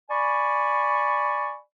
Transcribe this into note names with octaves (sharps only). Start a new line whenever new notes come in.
D5 G#5 B5 C#6